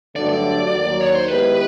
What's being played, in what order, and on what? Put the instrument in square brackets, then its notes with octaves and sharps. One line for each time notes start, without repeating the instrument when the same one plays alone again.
[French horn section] G2 D3 F#3 A3 D4 [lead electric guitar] D5
[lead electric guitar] D5
[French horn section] D#2 D#3 F#3
[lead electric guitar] C#5
C5
[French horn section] D#3 G#3 B3 E4 G4 [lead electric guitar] B4